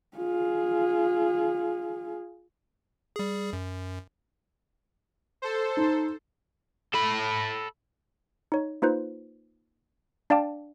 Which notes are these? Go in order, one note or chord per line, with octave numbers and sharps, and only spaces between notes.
F4 G#4
G3 G#4
F#2
A4 C5
D#4
A4 B5
D#4 C#5
A#3 D#4 F4 B4 C5
D4 D5 F5 G5 A5 D6